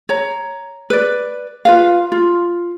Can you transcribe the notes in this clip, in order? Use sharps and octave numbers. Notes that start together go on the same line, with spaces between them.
C#5 A#5
B4 D5
F4 B4 F5
F4